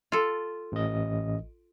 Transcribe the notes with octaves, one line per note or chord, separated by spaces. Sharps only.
F4 A4
A1 D#5